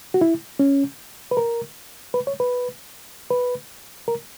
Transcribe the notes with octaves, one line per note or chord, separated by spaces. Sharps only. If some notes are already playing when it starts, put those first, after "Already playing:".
F#4
E4
C#4
B4
A#4
B4
C#5
B4
B4
A#4